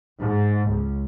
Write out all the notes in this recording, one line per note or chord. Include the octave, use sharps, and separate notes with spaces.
G#2
C#2